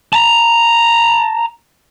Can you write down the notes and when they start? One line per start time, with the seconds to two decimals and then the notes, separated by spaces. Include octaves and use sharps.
0.13 A5 A#5